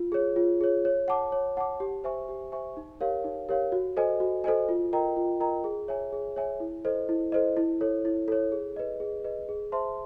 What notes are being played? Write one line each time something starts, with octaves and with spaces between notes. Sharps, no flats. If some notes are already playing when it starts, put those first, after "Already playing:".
Already playing: F4
G#4 C#5
F4
G#4 C#5
C#5
F#5 A5 D6
C#5
F#5 A5 D6
G4
C5 E5 G#5 C#6
G4
C5 E5 G#5 C#6
D#4
G4 A#4 C#5 F5
D#4
G4 A#4 C#5 F5
F#4
A4 C5 D#5 G#5
F#4
A4 C5 D#5 G#5
F4
A#4 D#5 G5 A#5
F4
A#4 D#5 G5 A#5
G#4
C#5 E5 G#5
G#4
C#5 E5 G#5
E4
A4 C5 D#5
E4
A4 C5 D#5
E4
A4 C#5
E4
A4 C#5
G#4
B4 D#5
G#4
B4 D#5
G#4
C5 E5 A5 C6